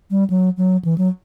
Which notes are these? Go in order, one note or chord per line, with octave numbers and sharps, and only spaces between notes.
G3
F#3
F#3
E3
F#3